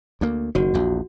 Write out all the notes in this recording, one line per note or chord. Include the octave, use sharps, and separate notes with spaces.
D2 A#3
F#1 D#3 F#4
A#1 E2